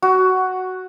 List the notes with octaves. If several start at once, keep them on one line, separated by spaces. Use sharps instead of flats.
F#4